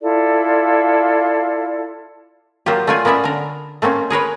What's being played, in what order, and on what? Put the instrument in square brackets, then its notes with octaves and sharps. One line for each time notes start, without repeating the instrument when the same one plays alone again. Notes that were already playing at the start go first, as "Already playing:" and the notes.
[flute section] E4 F4 A4 D5
[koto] F#3 A#3 F4 G4
A3 A#3 F4 D5 G#5
A#3 B3 C#4 D5 E5
D3 A#4
A3 A#3 C4 C#4
G#4 A#4 B4 C#5